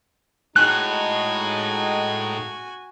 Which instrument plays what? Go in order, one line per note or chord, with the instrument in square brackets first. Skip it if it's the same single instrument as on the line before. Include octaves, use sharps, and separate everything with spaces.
[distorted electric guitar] A2 [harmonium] G#3 D#4 [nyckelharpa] F#4 G#5 [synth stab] F#6